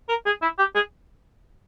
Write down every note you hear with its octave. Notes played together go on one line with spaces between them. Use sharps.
A#4
G#4
E4
G4
G#4